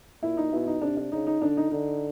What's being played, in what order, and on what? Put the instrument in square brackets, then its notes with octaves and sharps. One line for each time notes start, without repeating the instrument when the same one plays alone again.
[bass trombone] A#2 [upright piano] E4
[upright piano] D#4
[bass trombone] B2 [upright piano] E4
[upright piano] D#4
[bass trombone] C3 [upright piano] D4
[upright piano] D4
[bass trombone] C#3 [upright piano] D#4
[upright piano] D#4
[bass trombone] D3 [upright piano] D4
[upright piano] D#4
[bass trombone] D3 [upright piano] D#4